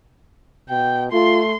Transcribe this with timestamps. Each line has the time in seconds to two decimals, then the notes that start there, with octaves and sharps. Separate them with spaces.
0.69 B2 G5
1.12 A3 F4 C6